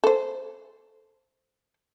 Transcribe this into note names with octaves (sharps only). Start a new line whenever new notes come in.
A4 C5